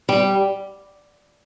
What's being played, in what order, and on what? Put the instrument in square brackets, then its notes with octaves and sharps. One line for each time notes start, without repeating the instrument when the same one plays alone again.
[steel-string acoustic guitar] G3